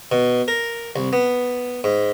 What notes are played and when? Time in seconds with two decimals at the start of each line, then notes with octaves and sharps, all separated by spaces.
0.12 B2
0.48 A#4
0.96 C2
1.13 B3
1.84 G#2